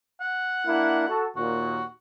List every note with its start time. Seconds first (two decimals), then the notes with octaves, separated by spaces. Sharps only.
0.21 F#5
0.66 A#3 D4 E4
1.07 F#4 A4
1.36 D#2 A#2 F#4